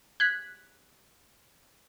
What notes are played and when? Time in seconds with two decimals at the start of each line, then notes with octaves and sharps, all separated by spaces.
0.20 F#6 G#6 B6